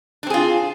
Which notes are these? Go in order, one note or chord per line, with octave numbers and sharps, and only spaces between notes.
C4 D4 F4 G#4